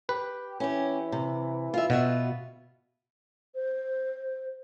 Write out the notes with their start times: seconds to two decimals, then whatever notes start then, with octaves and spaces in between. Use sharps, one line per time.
0.09 G4 B4
0.60 E3 C#4 G4
1.12 C3
1.74 F4 E5
1.90 B2 B3 F4 F#4 E5
3.55 C5